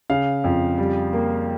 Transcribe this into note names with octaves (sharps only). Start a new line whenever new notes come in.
C#3 F5
F2
G3
A#3